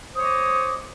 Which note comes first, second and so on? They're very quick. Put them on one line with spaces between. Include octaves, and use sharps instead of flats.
C5 D#6 C#5 D6 D#5